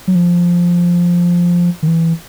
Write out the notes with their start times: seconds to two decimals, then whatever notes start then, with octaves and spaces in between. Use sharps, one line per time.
0.08 F#3
0.15 F3
1.83 D#3
1.87 E3